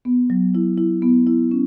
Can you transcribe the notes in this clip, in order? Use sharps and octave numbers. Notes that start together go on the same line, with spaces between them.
B3
F#3
E4
E4
B3
E4
C#4